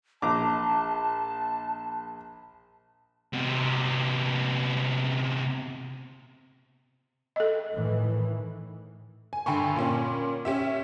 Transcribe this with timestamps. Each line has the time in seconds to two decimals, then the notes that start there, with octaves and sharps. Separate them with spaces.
0.22 A#1 A5 A#5 D6
3.33 C3 B3
7.36 A4 D#5
7.73 A2 D#3 E3
9.33 G#5
9.46 G2 D3 G5 G#5 B5 C#6
9.76 A#2 C#4
10.45 C#4 G4 E5